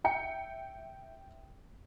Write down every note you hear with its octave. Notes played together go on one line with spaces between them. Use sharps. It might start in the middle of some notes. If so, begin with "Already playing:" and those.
E5 G5 C#7